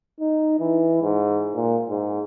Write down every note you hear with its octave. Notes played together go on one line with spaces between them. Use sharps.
D#4
E3
G#2
A#2
G#2